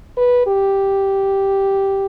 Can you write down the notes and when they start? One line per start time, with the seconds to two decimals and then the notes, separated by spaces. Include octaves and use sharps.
0.18 B4
0.47 G4